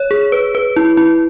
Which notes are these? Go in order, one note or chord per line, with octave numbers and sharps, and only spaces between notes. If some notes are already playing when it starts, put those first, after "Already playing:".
Already playing: C#5
G#4
B4
B4
E4
E4